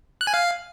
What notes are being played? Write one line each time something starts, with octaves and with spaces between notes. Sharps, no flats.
F#6
G#5
F5